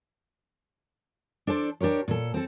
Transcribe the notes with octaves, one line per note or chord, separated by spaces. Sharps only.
D4 A4 C5 D5
D4 G4 A#4 C#5
A#2 A4
C4 A4